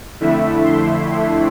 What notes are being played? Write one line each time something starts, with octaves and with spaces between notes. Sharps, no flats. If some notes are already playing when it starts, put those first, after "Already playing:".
F2 D3 A3 E4 E5
C6